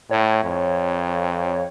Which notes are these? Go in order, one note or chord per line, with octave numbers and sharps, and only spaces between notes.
A2 C#5
F2